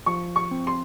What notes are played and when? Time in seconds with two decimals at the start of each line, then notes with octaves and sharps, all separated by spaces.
0.06 F3 C#6
0.36 C#6
0.51 C4
0.67 C6